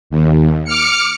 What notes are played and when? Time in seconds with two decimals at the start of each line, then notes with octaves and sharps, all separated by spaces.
0.10 D#2
0.65 D6 F6 C#7